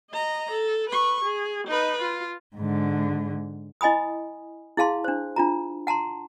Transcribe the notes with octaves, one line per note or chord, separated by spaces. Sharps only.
D#5 A#5
A4
B4 C#6
G#4
D#4 B4
F4
G#2 D3
E4 D#5 G#5 B5 D#6
E4 G#4 F5 A5 C6
D4 C5
D4 F4 A#5
F#5 A5 A#5 C6